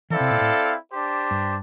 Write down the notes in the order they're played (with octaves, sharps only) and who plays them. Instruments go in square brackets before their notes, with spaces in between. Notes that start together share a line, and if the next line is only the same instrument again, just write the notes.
[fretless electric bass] E3 [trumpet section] C4 E4 A4 D5 F5
[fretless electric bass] C3
A#2
A2
[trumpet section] D4 G4 C5
[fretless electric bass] G2